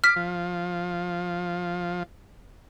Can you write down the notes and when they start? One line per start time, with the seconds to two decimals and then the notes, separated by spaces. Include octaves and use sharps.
0.04 D6 F6 B6
0.16 F3